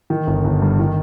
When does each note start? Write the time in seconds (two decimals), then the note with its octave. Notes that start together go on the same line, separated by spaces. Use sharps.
0.10 D#3
0.27 G1
0.44 G1
0.62 G2
0.79 D#3